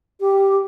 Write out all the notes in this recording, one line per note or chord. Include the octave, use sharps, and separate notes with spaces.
G4